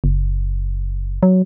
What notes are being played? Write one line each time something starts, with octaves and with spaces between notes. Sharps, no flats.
F#1
F#3